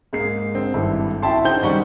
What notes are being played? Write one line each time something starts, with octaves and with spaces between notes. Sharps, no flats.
G#2 G#3 A#3 C7
D3 C4
G#1 G2 E4 A4
E4 F#4 E5 G5 A5 C6
C#3 D#4 C5 G5 G6 G7
F#2 D#3 G3 D#4 F#5 C#6